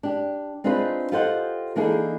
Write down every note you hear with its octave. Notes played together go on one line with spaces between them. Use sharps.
D4 G4
C4 D4 D#4 F4 G#4 B4
F4 G4 A4 C5 D#5 F#5
E3 A#3 D4 D#4 G#4 A4